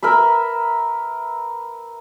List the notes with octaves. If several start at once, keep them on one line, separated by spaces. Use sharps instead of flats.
A#4 B4 E5 B5